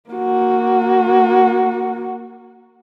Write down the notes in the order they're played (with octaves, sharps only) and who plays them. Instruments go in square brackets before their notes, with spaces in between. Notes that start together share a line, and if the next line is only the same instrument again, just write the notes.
[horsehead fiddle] A#3 F#4